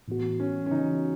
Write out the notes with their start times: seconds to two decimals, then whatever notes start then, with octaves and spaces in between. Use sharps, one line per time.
0.08 A2 E3 B3 F#4
0.40 C#4
0.66 C#4
0.71 C#3 E3 B3 D#4 F#4